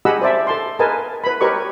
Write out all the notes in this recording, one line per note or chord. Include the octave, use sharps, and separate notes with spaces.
G4 G#4 D#5 F#5 B5 E6
C5 D5 E5 A5
A4 A5 C6
G#4 A#4 B4 D#5 G#5 A5
B4 B5
G4 A#4 B4 C#5 D#5 C#6